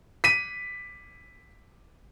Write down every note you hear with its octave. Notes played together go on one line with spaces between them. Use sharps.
B6 D#7